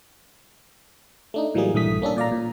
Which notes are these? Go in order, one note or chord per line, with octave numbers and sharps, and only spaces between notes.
A3 D4 D#4
A2 E3 F#3 G3 A#3 G#4
A#1 G2 E3 A3 D#6 B6
A#3 C#4 D4 A4
A#2 D5 F5 A#5
A#2